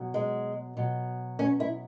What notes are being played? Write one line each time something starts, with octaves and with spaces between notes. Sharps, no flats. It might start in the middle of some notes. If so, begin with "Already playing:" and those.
Already playing: B2 F#3
G#3
B2 F#3
C#4
E4